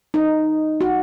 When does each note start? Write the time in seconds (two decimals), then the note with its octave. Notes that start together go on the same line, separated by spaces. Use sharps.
0.14 D#4
0.81 F#4